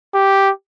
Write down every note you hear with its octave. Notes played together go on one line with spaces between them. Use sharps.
G4